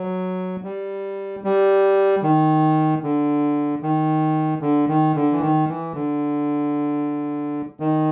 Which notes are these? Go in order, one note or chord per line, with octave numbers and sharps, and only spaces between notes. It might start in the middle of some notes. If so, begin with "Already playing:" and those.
Already playing: F#3
G3
G3
D#3
D3
D#3
D3
D#3
D3
E3
D#3
E3
D3
D#3